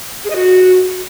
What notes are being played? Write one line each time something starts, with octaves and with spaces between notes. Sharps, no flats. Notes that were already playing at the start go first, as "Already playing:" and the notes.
G#4
D#5
F#4